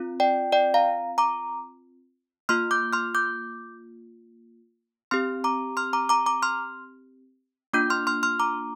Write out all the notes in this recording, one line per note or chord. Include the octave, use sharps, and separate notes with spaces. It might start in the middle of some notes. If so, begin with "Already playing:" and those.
Already playing: C4 F4
D5 G5
D5 G5
F5 A#5
A#5 D6
A#3 F4 C6 F6
D6 G6
C6 F6
D6 G6
C4 G4 C6 F6
A#5 D6
C6 F6
A#5 D6
A#5 D6
A#5 D6
C6 F6
A#3 D4 F4 D6 G6
C6 F6
C6 F6
C6 F6
A#5 D6